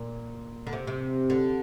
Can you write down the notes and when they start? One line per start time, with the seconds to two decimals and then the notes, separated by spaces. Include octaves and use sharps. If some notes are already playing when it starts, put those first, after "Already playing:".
Already playing: A#2
0.67 D3
0.73 C3
0.87 C3
1.30 D3